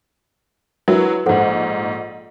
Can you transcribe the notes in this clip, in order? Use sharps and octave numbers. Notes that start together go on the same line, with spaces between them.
F#3 E4 F#4 A#4 B4
A#1 G#2 A4 C5 F#5